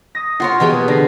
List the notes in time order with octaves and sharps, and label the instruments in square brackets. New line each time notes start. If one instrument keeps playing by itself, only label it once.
[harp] D#6 A#6
[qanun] F4 A#4 C#5 [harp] F#5 C6
[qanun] B2 G4 G5 [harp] E3 A#3 G#4
[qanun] D3 [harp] B5 A#6 C7